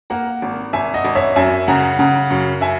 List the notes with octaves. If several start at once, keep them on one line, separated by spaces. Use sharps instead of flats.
A#3 F#5 A#5
G#1
G#1 E5 G#5
D#5 F#5
G#1
C#5 E5
F#2 E5 G#5
C#3 F#5 A#5
C#3 F#5 A#5
F#2
E5 G#5